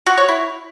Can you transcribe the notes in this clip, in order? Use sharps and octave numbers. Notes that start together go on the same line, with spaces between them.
F#4
C#5
E4